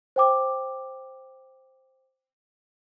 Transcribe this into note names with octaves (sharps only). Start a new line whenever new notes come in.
C5 G5 D6